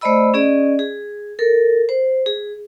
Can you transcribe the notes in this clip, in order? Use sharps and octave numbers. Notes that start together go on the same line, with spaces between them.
A3 C5 D5 D#5 B5 E6
C#4 G#4 D5 D#5
G#4
A4 A#4
C5
G#4